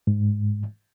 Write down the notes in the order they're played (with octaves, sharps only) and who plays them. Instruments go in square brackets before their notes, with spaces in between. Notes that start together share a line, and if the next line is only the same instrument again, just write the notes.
[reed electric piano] G#2